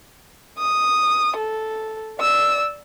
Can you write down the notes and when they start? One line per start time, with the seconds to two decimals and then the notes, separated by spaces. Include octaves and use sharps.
0.59 D#6
1.36 A4
2.19 D5 E6